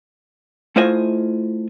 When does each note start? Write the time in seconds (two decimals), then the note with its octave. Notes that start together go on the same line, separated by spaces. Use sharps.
0.76 A3 E4 F4 C5 D#5 G#5